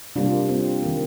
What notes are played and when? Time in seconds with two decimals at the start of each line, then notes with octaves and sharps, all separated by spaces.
0.16 C3 G3 A#3 D4 F4
0.49 C4
0.82 D#3 A#3